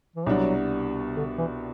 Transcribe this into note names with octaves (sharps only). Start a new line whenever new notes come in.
E3
C2 B2 F#3 G3 D4 F#4
D3
E3